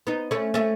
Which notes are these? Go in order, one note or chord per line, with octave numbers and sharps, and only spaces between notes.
B3 D#4
A3 C#4
A3 C#4